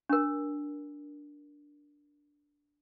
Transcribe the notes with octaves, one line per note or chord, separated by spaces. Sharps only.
D4 A#4